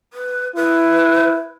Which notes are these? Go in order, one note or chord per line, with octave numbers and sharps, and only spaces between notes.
B4
E4 B4